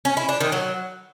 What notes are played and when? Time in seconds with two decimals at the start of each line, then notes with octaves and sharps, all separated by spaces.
0.05 C#4
0.17 E4
0.29 D4
0.40 D#3
0.52 F#3